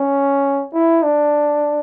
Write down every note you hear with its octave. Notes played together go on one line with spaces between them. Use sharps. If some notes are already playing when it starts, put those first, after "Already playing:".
Already playing: C#4
E4
D4